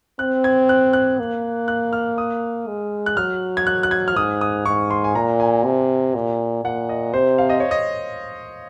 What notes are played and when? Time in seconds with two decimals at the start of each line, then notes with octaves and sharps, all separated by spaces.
0.19 C4 F#6
0.44 G#6
0.69 F#6
0.93 F#6
1.19 A#3
1.68 F#6
1.93 F6
2.18 D#6
2.67 G#3
3.06 F#6
3.17 F#3 F6
3.57 G#6
3.67 F#6
3.83 F#6
3.91 G#6
4.08 F6
4.16 G#2 D#6
4.41 D#6
4.66 G#2 C#6
4.91 C6
5.04 G#5
5.15 A#2 A#5
5.40 G#5
5.65 C3
6.15 A#2
6.64 A#2 F#5
6.89 D#5
7.14 C3 C5
7.38 F5
7.50 D#5
7.60 C#5
7.71 D#5